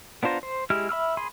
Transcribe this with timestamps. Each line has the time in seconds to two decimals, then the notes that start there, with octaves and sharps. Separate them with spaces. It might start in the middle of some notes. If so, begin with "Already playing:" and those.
0.23 B3 D4 F4 C5 A#5
0.43 C5
0.70 G#3 E4 G4 F6
0.89 E5 B5 E6 F6
1.17 G#4 B5 C6